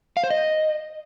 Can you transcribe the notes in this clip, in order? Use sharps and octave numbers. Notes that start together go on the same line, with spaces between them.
F5
C5
D#5